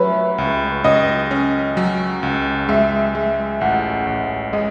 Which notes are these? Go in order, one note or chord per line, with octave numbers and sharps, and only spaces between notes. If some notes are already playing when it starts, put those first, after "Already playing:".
Already playing: F#3 C#4 B4 C#5 E5
C#2
C#2 D#5
C#4
F#3
C#2
G#3 E5
G#3
A1 F#5
A1
G#3 D#5